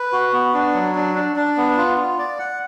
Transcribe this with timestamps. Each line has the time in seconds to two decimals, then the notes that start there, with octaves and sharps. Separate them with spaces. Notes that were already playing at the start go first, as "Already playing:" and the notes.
Already playing: B4
0.12 F#4
0.33 B3
0.54 D4
0.74 F#3
0.95 D4
1.15 D4
1.36 D4
1.57 B3
1.77 F4
1.98 F4
2.18 D5
2.39 F#5